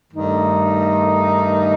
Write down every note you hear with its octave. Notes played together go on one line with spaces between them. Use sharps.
G2 D#3 A3 D#4